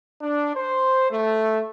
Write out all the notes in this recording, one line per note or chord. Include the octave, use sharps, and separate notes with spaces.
D4
C5
A3